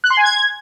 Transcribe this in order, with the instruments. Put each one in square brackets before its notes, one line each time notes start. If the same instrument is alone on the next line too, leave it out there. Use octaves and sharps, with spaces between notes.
[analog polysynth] F#6
C6
G#5
G#6